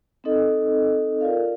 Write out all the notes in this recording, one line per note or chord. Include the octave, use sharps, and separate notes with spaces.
C4 D#4 A4 D#5
F4 A#4 D5 F5